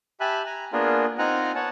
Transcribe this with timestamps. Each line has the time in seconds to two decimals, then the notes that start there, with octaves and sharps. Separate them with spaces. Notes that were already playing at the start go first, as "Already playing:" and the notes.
0.20 G4 E5 G#5 A5 B5 F#6
0.46 G#5 A#5
0.73 A#3 B3 D4 F4 G#4 A#4
1.18 C4 D#4 F4 F#5 G#5 A#5
1.55 B3 C#5 F#5 A5